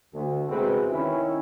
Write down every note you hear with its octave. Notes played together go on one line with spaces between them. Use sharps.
D2
E2 C3 G#3 C4 F#4 B4
D#3 C#4 E4